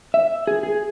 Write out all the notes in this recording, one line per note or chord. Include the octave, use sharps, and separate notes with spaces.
E5
G#4
G#4